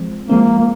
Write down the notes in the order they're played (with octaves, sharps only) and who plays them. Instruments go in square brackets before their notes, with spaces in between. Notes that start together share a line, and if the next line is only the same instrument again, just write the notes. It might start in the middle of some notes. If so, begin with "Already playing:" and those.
Already playing: [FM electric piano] F3 G#3 C4
[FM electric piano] F3 G#3 C4 [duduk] A#3
[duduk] A#3